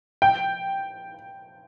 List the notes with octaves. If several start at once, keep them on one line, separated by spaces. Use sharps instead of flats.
G5